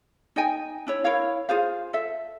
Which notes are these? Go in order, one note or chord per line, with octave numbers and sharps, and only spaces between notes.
D#4 D#5 G5 G#5
D4 E4 C#5
E4 A#4 C#5 F5
F4 G#4 C5 F5
A4 E5